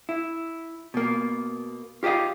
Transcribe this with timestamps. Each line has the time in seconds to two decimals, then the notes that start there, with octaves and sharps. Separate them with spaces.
0.09 E4
0.94 B2 A#3
2.03 F4 G4 A4 D#5 F5